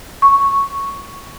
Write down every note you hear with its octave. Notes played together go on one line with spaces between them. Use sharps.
C#6